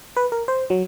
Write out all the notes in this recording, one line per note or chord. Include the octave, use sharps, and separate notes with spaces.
B4
A#4
C5
F#3